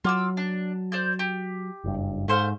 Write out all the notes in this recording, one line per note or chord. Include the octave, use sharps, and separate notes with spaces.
F#3 F4 D6 E6
D4
C5 D5 G6
G4
F#1 G2
G#2 A3 C5 F5